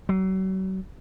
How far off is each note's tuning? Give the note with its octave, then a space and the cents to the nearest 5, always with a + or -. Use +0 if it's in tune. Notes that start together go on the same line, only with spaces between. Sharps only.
F#3 +40